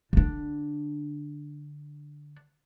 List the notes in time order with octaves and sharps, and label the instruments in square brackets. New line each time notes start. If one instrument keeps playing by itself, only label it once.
[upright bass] D3 D4